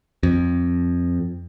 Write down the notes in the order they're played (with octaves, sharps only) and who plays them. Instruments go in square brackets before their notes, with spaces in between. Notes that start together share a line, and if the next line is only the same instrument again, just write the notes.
[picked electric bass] F2